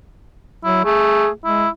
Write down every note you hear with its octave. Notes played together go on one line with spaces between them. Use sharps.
F#3 E4
A3 G#4
G#3 E4